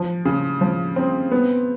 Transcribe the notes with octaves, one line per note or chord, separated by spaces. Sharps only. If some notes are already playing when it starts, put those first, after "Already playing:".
Already playing: F3
C#3
F3
C4
B3